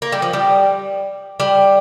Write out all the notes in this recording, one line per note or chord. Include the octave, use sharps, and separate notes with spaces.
A#3
G3
F3
G3
G3